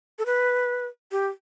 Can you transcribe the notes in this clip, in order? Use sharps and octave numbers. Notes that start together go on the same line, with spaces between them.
A4
B4
G4